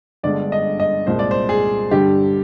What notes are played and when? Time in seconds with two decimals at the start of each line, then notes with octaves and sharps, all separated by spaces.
0.23 G1 G2 D3 G#3 D5
0.52 D#5
0.80 D#5
1.07 C2 A#2 G#3 C5
1.19 D5
1.31 C5
1.49 G#4
1.91 G2 D3 G3 G4